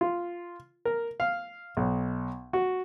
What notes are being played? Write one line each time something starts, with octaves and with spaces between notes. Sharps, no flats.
F4
A#4
F5
B1
F#4